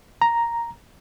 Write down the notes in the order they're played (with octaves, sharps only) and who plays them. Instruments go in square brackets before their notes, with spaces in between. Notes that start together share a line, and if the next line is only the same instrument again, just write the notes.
[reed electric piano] A#5